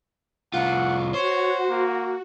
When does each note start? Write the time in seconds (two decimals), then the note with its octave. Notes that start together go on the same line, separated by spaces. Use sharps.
0.54 C2 F4 F#5
1.14 F#4 C5 C#5
1.70 A#3